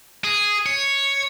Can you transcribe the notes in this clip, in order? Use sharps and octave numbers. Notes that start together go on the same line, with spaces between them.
G#4
C#5